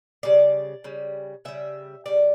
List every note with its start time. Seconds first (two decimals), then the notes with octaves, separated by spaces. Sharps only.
0.23 C#3 G3 D5
0.84 C#3 G3
1.45 C#3 G3 E5
2.06 C#3 G3 D5